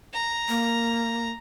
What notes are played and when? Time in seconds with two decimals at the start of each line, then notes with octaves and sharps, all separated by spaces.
0.13 A#5
0.49 A#3